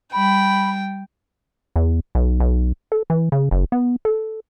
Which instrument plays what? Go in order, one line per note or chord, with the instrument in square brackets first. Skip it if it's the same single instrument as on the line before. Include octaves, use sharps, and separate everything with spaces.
[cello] G3 [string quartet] G5 [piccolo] B5
[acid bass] E2
B1
B1
A4
E3
C#3
F#1
B3
A4